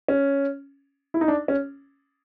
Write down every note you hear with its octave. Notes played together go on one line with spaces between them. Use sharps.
C#4
E4
D#4
D4
C#4